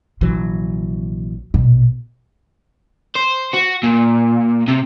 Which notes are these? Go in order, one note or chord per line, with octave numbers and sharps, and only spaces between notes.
A#1 C3 E3 F#3
A#1 B2
C5
F#4
A#2
C3